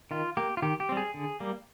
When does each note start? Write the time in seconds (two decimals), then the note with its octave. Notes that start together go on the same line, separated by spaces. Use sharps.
0.11 D#3 F4
0.37 A#3 G4
0.57 F4
0.62 D#3 G4
0.80 G4
0.89 G3 C4
0.97 G#4
1.14 D3
1.40 G3 A#3